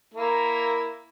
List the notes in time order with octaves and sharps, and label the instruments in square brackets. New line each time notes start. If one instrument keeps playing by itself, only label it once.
[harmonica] A#3 E4 A#4